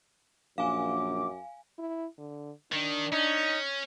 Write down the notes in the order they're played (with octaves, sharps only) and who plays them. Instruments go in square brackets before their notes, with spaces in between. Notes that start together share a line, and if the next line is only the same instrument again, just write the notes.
[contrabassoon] A#1 [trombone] F#2 [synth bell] F5 G#5 [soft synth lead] D6
[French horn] E4
D3
[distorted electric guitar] D#3 [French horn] D4
[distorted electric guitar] C#4 [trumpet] D#4